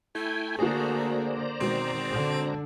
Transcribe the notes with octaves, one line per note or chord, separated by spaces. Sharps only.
A3 E4 G5 G#5
D3 A#3 F#4 G#4 C5 D5 A#5
B2 D#3 G#3 C4
D3 D4